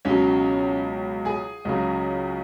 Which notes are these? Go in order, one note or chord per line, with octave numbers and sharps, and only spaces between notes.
C#2 B2 F#3 C#4 C#5
G#4 G#5
C#2 C#3 F#3